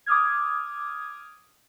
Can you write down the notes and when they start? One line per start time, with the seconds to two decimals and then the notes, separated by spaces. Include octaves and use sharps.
0.06 D6 D#6 F6 G#6